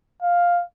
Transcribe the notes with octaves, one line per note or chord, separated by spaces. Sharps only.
F5